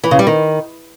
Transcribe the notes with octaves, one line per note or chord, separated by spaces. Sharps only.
E3
C#3
G3
D#3